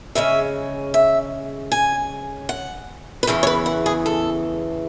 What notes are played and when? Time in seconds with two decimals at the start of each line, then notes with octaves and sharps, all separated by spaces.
0.15 C#3 G#3 C#4 E5
0.94 E5
1.72 G#5
2.49 F#5
3.23 B4
3.27 E2 C#3 E3 A4
3.43 C#5
3.47 B4
3.66 F#5
3.86 G#4
4.06 A4